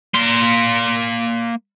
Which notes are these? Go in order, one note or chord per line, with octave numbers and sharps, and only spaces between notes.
A#3 C6